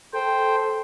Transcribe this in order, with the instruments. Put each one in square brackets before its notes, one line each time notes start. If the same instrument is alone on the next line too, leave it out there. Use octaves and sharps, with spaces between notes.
[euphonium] A4 [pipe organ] C5 G5